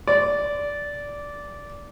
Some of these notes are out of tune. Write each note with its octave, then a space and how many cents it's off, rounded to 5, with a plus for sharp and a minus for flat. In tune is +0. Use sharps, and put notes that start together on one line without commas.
D5 -15